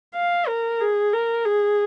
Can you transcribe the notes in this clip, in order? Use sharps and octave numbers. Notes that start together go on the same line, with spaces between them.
F5
A#4
G#4
A#4
G#4